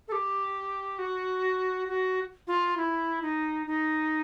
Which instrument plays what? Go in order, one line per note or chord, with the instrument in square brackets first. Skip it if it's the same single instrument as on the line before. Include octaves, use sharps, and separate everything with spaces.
[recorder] A4
G4
F#4
F#4
F4
E4
D#4
D#4